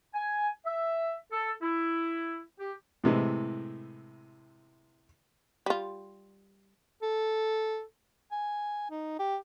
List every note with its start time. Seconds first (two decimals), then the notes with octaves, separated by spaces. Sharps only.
0.15 G#5
0.66 E5
1.33 A4
1.62 E4
2.60 G4
3.04 A2 C3 E3 G#3
5.66 G3 F4
7.02 A4
8.32 G#5
8.90 D#4
9.19 G4